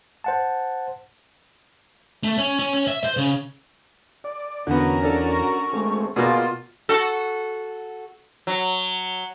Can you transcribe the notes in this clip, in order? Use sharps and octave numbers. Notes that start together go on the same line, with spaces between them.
C5 F#5 A5
A3
C#4
C#4
C#4
E5
C5
C#3
D5
E2 D3 B3 C#4 F#4 A#4
D4 A4 D5
C#6
G#3 A3 C4
B2 A#3 F4 G#4 D5
F#4 A4
F#3